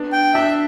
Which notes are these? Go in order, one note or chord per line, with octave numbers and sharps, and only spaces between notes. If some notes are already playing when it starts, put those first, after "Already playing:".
Already playing: B3 D4
G5
D4 E5